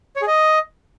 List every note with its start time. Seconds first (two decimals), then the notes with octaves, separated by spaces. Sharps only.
0.16 C#5
0.22 G#4
0.27 D#5